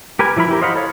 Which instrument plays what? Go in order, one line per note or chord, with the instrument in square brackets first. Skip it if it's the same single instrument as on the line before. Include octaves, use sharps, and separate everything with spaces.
[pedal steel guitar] G4 A#4 B4 G#5
E3 F3 E4 A#4 B5
E4 G4 A#4
C5 D#5 F5 F#5 B5
A4 C#5 F5